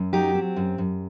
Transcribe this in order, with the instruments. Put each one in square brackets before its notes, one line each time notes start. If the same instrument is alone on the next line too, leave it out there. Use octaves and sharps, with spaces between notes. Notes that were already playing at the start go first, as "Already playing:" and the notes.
Already playing: [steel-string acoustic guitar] F#2
F#3 D#4 G4
C4
F#2
F#2